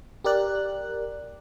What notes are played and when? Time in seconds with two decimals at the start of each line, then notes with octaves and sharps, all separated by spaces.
0.24 G4 A#4 D5 F#6